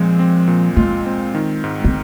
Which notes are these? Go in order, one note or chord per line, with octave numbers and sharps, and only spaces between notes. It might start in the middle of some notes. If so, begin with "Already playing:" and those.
Already playing: A#2 F3 G#3 C4
C4
A#2
G#3 F4
C4
D#3
G#2
C4